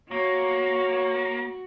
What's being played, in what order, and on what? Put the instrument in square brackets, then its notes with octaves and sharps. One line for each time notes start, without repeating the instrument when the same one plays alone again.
[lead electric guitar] A#3 [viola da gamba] F#4 [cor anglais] C#5